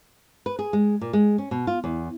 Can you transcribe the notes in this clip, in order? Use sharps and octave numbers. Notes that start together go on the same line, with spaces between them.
B4
G#4
G#3
A#2
G#3
C#4
B2
F4
E2